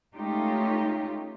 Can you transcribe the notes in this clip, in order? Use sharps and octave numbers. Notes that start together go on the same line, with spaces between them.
G#3 A3 C#4 D#4 F4 G4